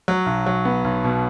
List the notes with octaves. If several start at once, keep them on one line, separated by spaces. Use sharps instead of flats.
F#3
B1
F#3
B3
B1
B2